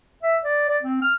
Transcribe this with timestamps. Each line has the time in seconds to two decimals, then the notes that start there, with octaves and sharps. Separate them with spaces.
0.23 E5
0.44 D5
0.68 D5
0.82 C4
1.02 F6